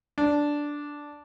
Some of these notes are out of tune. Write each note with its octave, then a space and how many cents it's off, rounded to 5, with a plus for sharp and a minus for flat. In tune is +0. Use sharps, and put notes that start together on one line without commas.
D4 -5